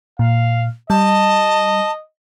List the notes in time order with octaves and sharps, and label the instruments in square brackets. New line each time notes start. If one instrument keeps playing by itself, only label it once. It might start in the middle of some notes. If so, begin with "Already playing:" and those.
[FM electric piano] A#2 [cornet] F5
[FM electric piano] G3 [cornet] D#5 [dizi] A5